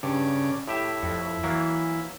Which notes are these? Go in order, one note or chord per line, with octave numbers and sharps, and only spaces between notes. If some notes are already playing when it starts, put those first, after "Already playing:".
G2 C#3 D5
A2 E4 G4 E5
F2
E3 F#3 A#3